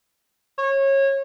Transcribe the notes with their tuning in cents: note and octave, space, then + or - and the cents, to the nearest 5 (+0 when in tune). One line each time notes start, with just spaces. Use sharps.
C#5 -25